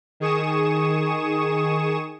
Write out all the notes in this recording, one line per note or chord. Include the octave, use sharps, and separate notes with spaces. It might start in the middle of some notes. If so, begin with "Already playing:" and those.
D#3 G#4 C#6 D#6 E7